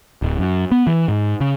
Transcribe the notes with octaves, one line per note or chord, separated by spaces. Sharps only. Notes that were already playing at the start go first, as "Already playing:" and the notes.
D1
F#2
B3
E3
G#2
C#3